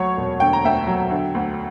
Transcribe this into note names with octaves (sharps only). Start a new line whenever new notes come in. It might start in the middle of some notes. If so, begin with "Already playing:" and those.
Already playing: D2 F#3 C#5
E1
D3 G5
A#5
D2 E5 G5
F#3
D3
D2